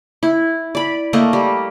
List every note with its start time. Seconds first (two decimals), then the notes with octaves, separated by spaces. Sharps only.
0.23 E4
0.75 D5 B5
1.13 A3 A#3 D#5
1.33 G3